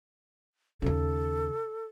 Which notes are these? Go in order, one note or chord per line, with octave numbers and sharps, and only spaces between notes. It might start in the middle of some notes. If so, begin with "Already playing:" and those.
D#2 C#3 A4